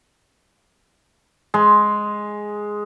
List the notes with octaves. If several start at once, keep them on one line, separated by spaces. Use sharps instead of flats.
G#3